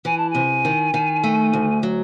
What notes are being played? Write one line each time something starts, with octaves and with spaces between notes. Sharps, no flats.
E3 G#5
A5
G#5
C3
D#3
D#3
A3
D2
F#3